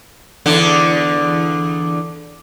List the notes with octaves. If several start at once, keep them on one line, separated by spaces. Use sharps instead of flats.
E2 D3 D4